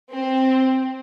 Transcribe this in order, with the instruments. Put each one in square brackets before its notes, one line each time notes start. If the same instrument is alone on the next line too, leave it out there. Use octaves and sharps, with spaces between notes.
[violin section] C4